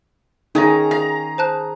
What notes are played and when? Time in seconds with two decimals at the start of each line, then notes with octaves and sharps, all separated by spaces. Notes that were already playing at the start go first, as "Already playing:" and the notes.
0.55 D#3 C#4 D#4 G#4 A#5
0.91 F5 A#5
1.38 C5 A5 F#6